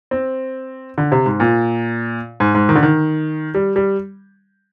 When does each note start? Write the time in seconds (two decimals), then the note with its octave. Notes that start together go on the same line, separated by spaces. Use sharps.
0.11 C4
0.98 D3
1.12 C3
1.26 G#2
1.40 A#2
2.40 G#2
2.55 G#2
2.69 D#3
2.75 D3
2.83 D#3
3.55 G3
3.76 G3